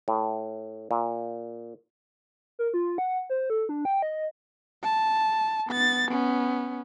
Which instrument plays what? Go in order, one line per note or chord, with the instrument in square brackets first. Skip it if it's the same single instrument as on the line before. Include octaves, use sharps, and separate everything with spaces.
[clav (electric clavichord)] A2
A#2
[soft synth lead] A#4
F4
F#5
C5
A4
D4
G5
D#5
[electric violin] A5
B3 A6
B3 C#4